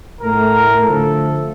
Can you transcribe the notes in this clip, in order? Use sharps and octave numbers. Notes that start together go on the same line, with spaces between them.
A2 A3 A#4
D3 F3 A3 A4